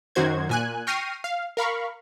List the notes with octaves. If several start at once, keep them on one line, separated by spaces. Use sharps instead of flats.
F#2 D#3 F#4 C5 G#6
A#2 G#5 F#6
G5 C#6 F6 A#6 C7 D#7
F5
A#4 F5 B5 C#6